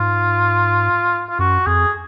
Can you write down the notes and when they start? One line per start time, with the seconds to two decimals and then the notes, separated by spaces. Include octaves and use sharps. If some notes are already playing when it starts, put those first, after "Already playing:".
Already playing: G#2 F4
1.30 F4
1.39 F#2 F#4
1.66 F2 G#4